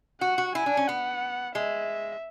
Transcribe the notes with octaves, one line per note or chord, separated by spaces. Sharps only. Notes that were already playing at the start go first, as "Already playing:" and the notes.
F#4 F#5
F#4
E4 G#5
D4
C#4
B3 F#5
G#3 E5